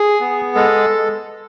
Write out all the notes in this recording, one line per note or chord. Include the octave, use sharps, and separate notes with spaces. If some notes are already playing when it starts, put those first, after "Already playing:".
Already playing: G#4
B3
G#3 A4